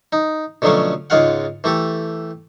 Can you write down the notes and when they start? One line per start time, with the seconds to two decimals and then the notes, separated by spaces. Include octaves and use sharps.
0.13 D#4
0.62 B2 D3 F3 F#3 A3 C#4
1.10 C#2 G#2 G#3 F4 F5 F#5
1.64 E3 A3 G4 A4